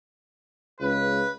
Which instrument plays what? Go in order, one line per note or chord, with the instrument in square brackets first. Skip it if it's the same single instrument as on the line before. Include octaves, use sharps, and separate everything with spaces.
[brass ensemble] C#2 [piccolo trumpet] B4